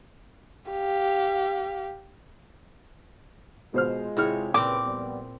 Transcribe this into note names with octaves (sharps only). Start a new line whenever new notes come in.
G4 F5
B2 G#3 F4 C5 F6
C3 E4 G#4 C#5 F6
A#2 C#3 C4 B4 D6
F3 G3 B3